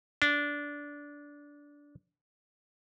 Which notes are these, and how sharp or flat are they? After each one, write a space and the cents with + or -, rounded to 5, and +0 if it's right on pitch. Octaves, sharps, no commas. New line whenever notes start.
D4 -15